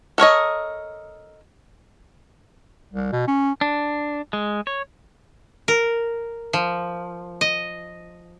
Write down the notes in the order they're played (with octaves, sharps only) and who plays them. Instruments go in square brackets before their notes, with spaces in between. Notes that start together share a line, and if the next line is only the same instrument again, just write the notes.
[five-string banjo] A4 A#4 C#5 D#5
[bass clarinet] C2
B2
C#4
[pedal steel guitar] D4
G#3
C#5
[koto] A#4
F3
D#5